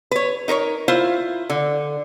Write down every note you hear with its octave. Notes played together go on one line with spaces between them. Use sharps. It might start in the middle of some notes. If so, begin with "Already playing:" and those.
B4 C#5
D#4 A#4 C5 C#5
E4 F4 C5
D3